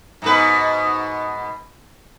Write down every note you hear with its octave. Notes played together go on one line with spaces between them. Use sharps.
G#2 B2 B4